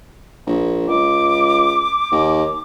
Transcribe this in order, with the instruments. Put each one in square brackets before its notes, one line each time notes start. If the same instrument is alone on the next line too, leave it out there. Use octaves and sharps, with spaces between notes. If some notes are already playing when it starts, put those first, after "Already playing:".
[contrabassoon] A#1
[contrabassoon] C#2 [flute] D6
[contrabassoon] D#2